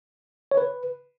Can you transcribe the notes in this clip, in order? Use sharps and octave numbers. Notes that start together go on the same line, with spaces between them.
C#5
B4